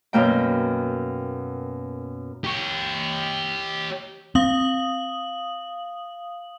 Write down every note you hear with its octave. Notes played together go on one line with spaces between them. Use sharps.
F#2 B2 A#3 G5
G4 C#5
C4 F5 D#6 F#7